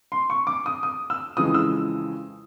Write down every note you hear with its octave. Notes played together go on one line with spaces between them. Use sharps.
C6
C#6
D6
D#6
D#6
E6
F2 C#3 E3 G#3 D#6
E6